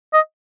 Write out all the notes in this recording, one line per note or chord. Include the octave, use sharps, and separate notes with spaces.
D#5